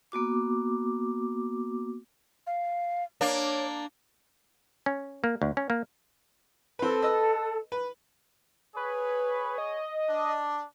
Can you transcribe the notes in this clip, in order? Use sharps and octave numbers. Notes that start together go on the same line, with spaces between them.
A#3 B3 F#4 D6
F5
A#3 D4 C#5
C#4
A#3
D2
C#4
A#3
C4 A4 B4
B4 D#5 E6
B4
G#4 B4 C#5
D#5
D4